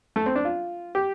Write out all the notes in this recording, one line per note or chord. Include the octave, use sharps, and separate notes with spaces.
A3
C4
D4
F4
G4